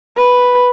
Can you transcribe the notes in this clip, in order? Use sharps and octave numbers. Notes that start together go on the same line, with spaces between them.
B4